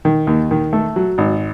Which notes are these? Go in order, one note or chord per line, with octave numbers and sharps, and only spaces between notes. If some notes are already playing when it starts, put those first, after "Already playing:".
D#3
D#2
D#3
A3
F#3
G#1